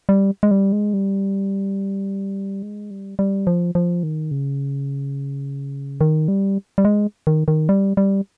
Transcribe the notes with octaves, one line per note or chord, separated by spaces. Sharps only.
G3
G#3
G3
G#3
G3
G#3
G3
G3
F3
F3
D#3
C#3
D#3
G3
G3
G#3
D#3
D#3
G3
G3